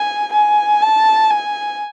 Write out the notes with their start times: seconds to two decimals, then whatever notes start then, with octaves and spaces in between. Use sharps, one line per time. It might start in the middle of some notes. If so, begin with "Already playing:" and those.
Already playing: G#5
0.33 G#5
0.82 A5
1.30 G#5